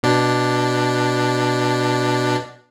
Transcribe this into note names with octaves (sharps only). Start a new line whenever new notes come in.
B2 D4